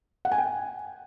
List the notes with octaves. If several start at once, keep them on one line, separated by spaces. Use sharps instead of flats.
F#5
G#5
G5